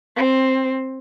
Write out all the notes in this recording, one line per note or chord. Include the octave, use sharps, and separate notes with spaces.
C4